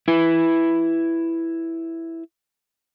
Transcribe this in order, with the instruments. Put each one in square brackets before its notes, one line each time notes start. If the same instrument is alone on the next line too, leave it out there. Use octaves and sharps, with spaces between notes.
[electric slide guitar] E4 B4